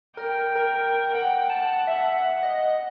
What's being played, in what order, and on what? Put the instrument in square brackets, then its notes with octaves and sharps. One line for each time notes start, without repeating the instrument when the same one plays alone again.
[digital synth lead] A#4 [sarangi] G5
[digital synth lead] A#4
[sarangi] F#5 [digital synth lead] G5
[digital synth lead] A5
E5
D#5